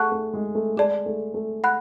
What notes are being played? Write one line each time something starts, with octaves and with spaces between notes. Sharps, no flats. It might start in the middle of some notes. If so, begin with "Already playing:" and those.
Already playing: A3 G#4 F#5 A5 C#6 F#6
A3
G#3
A3
G#3 G#4 D5 A5
A3
A3
F#5 B5 F#6